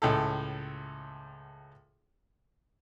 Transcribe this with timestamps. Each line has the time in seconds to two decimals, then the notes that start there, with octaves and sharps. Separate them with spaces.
0.02 C#2 A2 A4